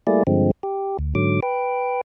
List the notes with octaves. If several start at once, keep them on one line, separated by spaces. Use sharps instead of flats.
G3 A3 A#3 E4 G#4 D5
G2 D3 F3 G#3 C4
G4
D2
G#2 D3 F#3 D6
B4 G5